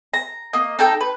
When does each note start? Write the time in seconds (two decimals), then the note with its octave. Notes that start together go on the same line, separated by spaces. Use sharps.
0.14 A#5
0.53 A#3 D#5
0.79 D#4 A4 G5
1.01 B4